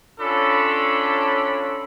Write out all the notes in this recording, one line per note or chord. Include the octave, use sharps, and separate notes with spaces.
C#4 D4 F4 A4 C#5 B5